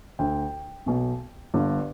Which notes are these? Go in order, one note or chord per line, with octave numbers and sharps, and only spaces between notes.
D2 D3 G5
B1 B2
G1 G2 D3